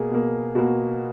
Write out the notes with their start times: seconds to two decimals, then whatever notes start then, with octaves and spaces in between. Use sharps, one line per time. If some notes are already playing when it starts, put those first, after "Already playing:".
Already playing: B2 A#3 G#4
0.11 B2 A#3
0.55 B2 A#3 F#4